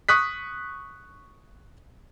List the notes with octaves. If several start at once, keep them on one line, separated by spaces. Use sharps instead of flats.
C#6 D#6 F#6 B6